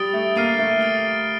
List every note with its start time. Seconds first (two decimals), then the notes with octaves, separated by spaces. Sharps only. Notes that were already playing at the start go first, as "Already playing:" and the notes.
Already playing: G3 D#6 A6 D7 G7
0.13 A3
0.36 A#3 F6 C7 D#7 G7
0.59 A3
0.81 A6 D7 G7